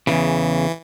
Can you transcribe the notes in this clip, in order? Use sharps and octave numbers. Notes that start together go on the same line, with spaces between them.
E2 G2 C#3 E3